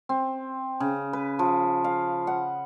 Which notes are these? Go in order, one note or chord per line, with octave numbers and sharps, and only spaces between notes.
C4
C#3
B4
F3
F5
F#5